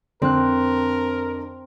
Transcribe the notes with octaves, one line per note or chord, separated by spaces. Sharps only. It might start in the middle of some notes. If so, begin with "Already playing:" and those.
F2 D3 C4 A#4 F#6